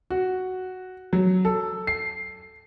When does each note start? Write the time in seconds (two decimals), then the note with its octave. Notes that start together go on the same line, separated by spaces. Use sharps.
0.10 F#4
1.13 F#3
1.45 A4
1.87 C7